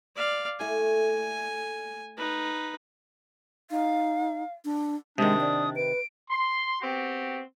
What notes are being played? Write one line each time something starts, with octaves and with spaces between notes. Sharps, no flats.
D5 F5
A3 E4 A4 G#5
D#4 B4
D#4 F5
D4
C3 D#3 G#3 D4 D#6
D5
B4 D7
C6
B3 C4 F#4 G4